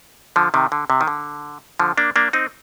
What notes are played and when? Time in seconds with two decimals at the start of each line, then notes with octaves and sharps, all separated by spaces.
0.36 D3 F3
0.54 C3 D#3
0.72 D3
0.90 C3
1.01 D#3
1.07 D3
1.79 D3 F3
1.97 A#3 D4
2.16 A#3 D4
2.33 C4 D#4